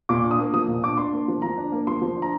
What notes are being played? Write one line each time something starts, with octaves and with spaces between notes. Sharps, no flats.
A#2 D6
D4
D#6
A#3
F3 D#6
A#2
D4 D6
D4 C6
A#3
F3
F3 A#5
D4
A#3
F3 C6
F3
D4
A#5